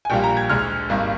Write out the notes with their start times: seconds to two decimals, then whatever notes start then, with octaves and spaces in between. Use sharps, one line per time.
0.05 G#5
0.10 A#1 A#2 G3 A#3 G5
0.24 A#5
0.37 G#6
0.49 D2 D3 G#3 F6
0.89 G#1 G2 D#3 A#3